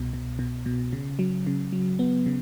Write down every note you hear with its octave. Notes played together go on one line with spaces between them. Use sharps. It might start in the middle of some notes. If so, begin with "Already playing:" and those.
Already playing: C2 B2
B2
B2
B2
C#3
F#3
C#3
F#3
B3
C#3